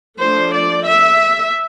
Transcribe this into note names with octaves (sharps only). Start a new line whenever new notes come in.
F3 A3 D4 C5
D5
E5